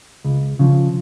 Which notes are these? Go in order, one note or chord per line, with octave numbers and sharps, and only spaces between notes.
C#2
C#3 F3